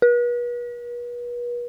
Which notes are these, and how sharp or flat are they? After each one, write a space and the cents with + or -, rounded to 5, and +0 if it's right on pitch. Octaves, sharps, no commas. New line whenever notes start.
B4 -40